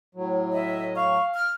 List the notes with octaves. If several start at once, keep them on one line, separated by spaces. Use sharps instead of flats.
A2 F#3
D#5 E5
F5 C#6
F6